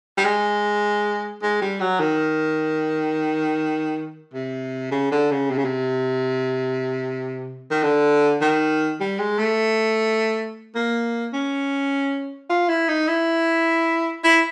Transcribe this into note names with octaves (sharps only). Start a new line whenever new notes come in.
G3
G#3
G#3
G3
F#3
D#3
C3
C#3
D3
C#3
C3
C#3
C3
D#3
D3
D#3
G3
G#3
A3
A#3
C#4
F4
E4
D#4
E4
E4